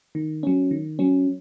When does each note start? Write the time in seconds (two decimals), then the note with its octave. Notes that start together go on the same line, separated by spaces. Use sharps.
0.15 D#3
0.43 F#3 C#4
0.71 D#3
0.99 F#3 C#4